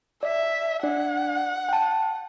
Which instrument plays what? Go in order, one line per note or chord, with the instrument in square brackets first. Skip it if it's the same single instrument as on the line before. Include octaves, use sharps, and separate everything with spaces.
[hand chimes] D5 [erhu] E5
[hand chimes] D4 D5 [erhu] F#5
[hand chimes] G5 A5